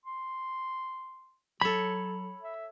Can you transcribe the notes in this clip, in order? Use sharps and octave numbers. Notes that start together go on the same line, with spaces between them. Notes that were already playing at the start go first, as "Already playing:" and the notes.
C6
F#3 A4 C#5 B5
E5